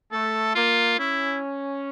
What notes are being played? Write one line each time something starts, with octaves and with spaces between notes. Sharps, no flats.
A3 A4
A#3 F4
C#4 E4